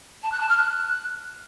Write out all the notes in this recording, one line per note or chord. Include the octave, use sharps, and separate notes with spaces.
A5
F#6
A5
F6
F#6